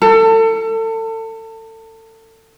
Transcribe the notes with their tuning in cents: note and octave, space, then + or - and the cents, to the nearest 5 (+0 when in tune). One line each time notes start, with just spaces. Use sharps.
A4 +30